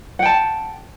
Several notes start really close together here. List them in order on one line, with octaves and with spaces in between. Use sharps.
F#5 G5 A5